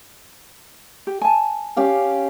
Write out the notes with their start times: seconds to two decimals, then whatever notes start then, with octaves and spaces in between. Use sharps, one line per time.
1.07 G4
1.21 G#5 A5
1.77 C#4 G4 F5